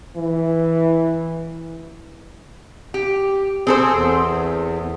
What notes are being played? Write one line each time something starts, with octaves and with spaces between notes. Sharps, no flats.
E3
G4
C4 G#4 A4 C5
E2